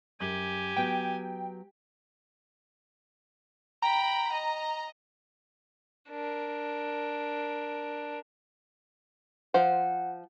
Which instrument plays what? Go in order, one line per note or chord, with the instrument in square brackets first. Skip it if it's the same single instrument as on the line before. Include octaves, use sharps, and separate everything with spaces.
[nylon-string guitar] F#2 [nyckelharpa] G4 G#5
[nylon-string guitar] F#3 B3 F#4 [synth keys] G5
[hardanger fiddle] G5 B5 [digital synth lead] A#5
[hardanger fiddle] D#5
[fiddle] D4 A#4
[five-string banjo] F3 C5 [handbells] F#5